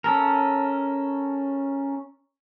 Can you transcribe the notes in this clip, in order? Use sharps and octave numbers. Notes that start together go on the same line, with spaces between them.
C#4 A4 A#4